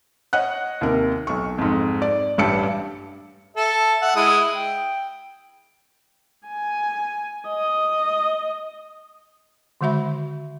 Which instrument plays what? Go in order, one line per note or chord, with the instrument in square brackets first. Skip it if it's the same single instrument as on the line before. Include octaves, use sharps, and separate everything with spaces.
[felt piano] C#5 D#5 F#5 F#6
D#2 C3 A#4
B1 C#6
F2 G#2
D5
A1 G2 G4 A5 E6 C#7
[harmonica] A4 E5
E5 F#5
G#3 E4 D#6
G5
[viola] G#5
D#5
[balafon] D3 D#3 G#3 F#4 E5 B5